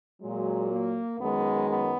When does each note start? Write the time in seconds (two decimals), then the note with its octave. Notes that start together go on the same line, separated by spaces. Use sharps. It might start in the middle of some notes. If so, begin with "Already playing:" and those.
0.21 A#2 F#3 G#3
0.70 A#3
1.19 F#2 D#3 G#3 B3
1.68 B3